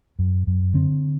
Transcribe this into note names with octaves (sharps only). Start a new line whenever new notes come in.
F#2
F#2
D3 C4